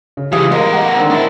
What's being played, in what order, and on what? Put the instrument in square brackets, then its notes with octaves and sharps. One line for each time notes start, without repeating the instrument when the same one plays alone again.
[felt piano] C#3
[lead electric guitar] E3 F3 [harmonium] G#3 [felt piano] G4 F5 D#6
[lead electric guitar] B3 A#4 [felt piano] D#5
[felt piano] F#5
[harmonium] D3 D#3 C4
[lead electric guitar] D4 E4